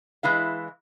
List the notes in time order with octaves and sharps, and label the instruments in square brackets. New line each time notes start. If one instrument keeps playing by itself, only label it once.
[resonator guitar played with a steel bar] E3 G#3 E4 F5